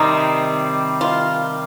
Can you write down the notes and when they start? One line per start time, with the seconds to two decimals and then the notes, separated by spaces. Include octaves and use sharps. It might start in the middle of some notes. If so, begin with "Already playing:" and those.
Already playing: C3 D#3 G3 C4 D#4
1.01 F4